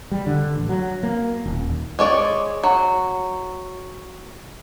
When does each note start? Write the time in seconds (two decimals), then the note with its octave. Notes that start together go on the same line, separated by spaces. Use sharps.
0.11 G3
0.26 D3
0.54 A1
0.69 F#3
1.03 A#3
1.46 D#1
1.99 G#3 C#5 D5
2.64 F#3